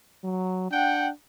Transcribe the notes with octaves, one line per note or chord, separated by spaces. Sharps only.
F#3
D4 F#5 G5